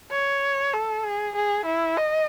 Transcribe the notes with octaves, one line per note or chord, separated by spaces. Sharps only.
C#5
A4
G#4
G#4
E4
D#5